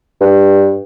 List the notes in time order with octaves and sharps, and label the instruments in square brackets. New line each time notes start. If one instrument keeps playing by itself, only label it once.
[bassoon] G2